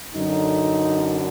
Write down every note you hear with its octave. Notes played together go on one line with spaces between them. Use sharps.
F#2 D3 D#4